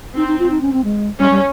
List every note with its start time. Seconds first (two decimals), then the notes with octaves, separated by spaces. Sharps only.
0.16 C4 D#4
0.28 D#4
0.40 F4
0.50 D#4
0.62 C#4
0.73 C4
0.84 G#3
1.19 G3 C#4
1.31 G3